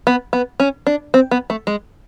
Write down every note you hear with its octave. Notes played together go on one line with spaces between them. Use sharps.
B3
B3
C#4
D4
C4
B3
A3
G#3